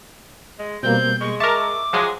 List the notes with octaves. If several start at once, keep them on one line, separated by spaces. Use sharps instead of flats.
G#3
B2 G3 A#3 C4 G6
G#3 C#6
A#4 E5 A5 C#6 D6 E6
F3 F#3 G#3 G#4